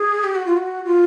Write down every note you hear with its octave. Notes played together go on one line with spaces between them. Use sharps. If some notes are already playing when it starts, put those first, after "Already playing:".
Already playing: G#4
G4
F#4
F4
F#4
F4